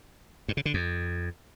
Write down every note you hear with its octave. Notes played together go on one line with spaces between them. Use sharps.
G2
C#3
D3
F2